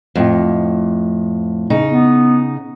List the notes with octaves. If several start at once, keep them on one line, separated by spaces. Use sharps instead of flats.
F2 A2
C#3 D#4
B3